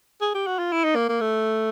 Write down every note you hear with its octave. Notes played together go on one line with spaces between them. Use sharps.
G#4
G4
F#4
F4
E4
D#4
A#3
A#3
A3